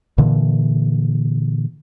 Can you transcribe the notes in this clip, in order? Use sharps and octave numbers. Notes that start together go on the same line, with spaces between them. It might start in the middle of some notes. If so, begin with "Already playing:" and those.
A#2 D3 E3